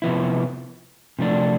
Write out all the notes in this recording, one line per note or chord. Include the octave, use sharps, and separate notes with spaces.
C3 F3 B3 E4
C3 F3 A3 D4